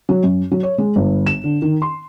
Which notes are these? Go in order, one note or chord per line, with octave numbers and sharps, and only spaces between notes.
F#3
F#2
F#3
C#5
G#3
G1
E7
D3
D#3
C6